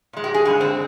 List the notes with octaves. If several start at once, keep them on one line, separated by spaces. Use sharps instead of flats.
A#2 G#3
G4
G#4
G2 D3 G#3 G#4
C4